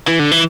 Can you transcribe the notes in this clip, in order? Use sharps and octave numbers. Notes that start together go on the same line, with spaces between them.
E3
D3
E3